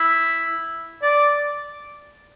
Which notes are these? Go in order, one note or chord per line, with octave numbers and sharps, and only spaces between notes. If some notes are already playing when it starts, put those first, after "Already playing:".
Already playing: E4
D5